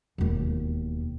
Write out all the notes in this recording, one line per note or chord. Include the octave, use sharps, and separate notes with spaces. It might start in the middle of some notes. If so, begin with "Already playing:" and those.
E1 D#2